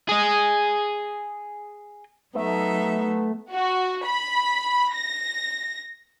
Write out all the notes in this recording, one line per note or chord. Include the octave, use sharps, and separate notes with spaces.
G#4 D#5
F#3 A3 B3 D#4 E5
F#4
B5
A#6